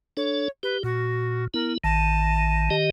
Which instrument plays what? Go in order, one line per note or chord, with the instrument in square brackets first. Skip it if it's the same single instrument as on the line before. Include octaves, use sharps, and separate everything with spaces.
[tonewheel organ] D4 A4 [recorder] C#5
[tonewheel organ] G4 [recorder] B4
[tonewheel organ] A#2 [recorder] F#4
[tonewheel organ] B3 E4 [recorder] A#4
[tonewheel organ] A1 D#3 [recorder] A5
[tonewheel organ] D#3 G4 D#5